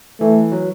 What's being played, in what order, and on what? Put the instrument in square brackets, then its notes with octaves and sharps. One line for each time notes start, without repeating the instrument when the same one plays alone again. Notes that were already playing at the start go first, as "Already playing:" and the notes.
[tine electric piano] E3 [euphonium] A3
[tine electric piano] F#3